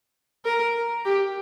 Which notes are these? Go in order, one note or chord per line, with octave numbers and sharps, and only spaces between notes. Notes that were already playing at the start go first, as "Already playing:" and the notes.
A#4
G4